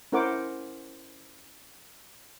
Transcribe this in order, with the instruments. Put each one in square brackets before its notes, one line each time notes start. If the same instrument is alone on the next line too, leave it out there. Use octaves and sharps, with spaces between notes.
[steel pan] C#4 E4 A#4 C5 F#5 D6